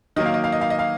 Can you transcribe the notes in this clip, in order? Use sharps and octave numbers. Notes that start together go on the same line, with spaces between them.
D#3 F#3 A#3 D#5
F5
D#5
F5
D#5
F5
D#5
F5